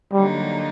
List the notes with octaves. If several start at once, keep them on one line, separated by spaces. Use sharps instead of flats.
D3 F#3 G3 A#3 D#4